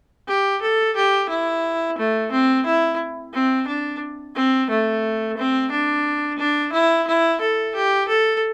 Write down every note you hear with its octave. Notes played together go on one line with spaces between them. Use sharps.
G4
A4
G4
E4
A3
C4
E4
C4
D4
C4
A3
C4
D4
D4
E4
E4
A4
G4
A4